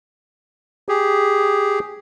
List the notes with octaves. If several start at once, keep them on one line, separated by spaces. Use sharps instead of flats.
G4 G#4